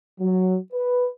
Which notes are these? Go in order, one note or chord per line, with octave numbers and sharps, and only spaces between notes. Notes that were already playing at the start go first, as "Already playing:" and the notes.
F#3
B4